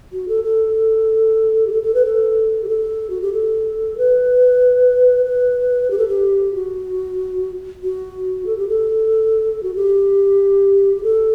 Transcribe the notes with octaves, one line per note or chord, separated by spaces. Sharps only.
F#4
A4
A4
G4
A4
A4
B4
A4
G4
A4
F#4
G4
A4
B4
B4
G4
A4
G4
F#4
F#4
A4
G4
A4
F#4
G4
G4
A4